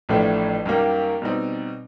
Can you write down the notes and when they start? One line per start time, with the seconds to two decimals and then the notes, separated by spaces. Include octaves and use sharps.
0.09 A1 A2 F3 A3 D4
0.66 F#2 D#3 G3 A#3
1.22 B2 G3 C4 D#4